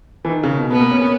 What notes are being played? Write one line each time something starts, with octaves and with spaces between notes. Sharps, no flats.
E3
D#3
C#3
B2
B2 B3
A#3
C#4
C#4